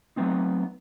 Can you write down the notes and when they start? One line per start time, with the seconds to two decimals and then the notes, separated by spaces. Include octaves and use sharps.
0.16 F#3 A3 B3 C4 D#4